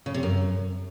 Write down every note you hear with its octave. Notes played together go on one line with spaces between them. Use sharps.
C#3
C3
F#2